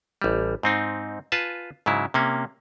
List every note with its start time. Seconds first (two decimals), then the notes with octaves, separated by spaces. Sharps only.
0.22 A1 G3
0.63 G#2 C4 D#4
1.32 F4 B4 G#5 A5
1.86 G#2 C#3 F#3 E4
2.14 C3 A#3 C#4